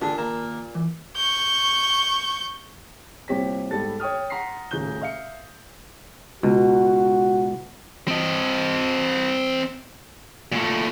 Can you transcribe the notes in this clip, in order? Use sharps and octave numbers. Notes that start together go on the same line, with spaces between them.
A#2 D3 D4 G4 G#4
D#2 A#3 A5 A#5
E3
C#6 G6
C2 A#2 C4 G4 C#5 B6
G#2 G3 B3 G4 A4 A6
C#5 G5 D#6 F6
F#5 A#5 C6 B6 C7
D#1 A2 C#3 A#5 G6 G7
E5 F5 C#7
C#2 B2 F#4
C4 D#5
A#2 A3